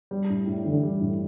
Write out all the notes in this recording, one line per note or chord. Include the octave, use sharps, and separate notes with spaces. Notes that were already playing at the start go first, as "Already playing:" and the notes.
G3
A2
A2
D3 E3
G3
A2